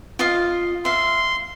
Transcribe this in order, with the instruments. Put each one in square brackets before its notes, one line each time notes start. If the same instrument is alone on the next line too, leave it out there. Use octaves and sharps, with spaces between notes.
[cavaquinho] F4 D#5 F5
[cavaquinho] E5 F5 [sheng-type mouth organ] C6